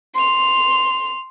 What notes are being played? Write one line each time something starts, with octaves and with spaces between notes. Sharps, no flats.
C6 F7